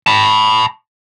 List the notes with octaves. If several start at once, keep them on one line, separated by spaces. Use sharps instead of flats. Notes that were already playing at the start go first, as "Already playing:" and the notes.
A5 B5